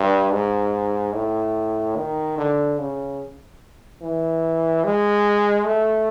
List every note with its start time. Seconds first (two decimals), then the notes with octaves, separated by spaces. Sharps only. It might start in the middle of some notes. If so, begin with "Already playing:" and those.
Already playing: G2
0.33 G#2
1.14 A2
1.96 D#3
2.37 D3
2.79 C#3
4.02 E3
4.84 G#3
5.66 A3